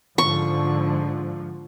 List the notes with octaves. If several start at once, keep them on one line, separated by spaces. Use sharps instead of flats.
G#2 D3 F3 C#6